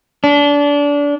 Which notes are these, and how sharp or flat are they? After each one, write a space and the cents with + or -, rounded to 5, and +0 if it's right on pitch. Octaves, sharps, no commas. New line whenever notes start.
D4 -25